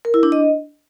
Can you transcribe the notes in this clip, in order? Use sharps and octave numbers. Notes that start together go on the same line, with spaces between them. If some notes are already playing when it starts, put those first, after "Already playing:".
A#4
E4
D4
D#5